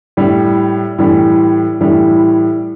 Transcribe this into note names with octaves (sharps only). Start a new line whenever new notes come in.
A2 G3
A2 E3 G3
A2 E3 G3